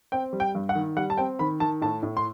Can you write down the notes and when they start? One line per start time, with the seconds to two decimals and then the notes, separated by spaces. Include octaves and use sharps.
0.12 C4 G5
0.33 G3
0.40 G5
0.55 G2
0.69 F#5
0.75 D#3
0.97 G3 F#5
1.10 A5
1.18 C4 G5
1.39 D#3 B5
1.60 D#3 A5
1.82 A2 A5
2.03 A2
2.17 C6